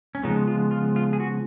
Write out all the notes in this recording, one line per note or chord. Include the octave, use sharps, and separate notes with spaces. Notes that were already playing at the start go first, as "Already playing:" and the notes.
C#4
C#3 F3 G#3 B3 D#4
F4
F4
F4
G#4
F#4